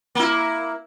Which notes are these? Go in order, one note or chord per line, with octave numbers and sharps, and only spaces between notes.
A#3 E4